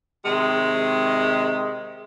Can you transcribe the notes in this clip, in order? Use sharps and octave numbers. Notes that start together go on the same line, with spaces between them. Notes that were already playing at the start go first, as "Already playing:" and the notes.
C3 D#3 G#3